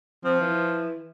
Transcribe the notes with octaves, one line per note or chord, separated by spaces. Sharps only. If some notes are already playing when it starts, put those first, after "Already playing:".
F3 C4
E3